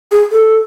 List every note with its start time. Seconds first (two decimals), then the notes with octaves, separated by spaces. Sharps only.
0.11 G#4
0.32 A4